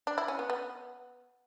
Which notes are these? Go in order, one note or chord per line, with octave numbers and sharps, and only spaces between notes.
D4
E4
C#4
B3
B3